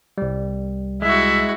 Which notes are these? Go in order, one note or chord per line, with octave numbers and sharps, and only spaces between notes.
C2 G3
G#3 E4 F#4 E5